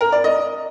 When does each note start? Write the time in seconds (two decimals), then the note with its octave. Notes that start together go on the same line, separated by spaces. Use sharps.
0.01 A#4
0.12 D5
0.24 D#5